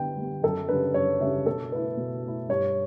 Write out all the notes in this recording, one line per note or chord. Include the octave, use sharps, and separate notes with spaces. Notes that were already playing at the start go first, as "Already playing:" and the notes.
Already playing: D3 G3 B3 G5
G3 B3
F#2 A4
C#3 G3 D4 B4
F#2 C#5
C#3 G3 D4 E5
B2 A4
A3 E4 B4
B2
A3 E4
G2 C#5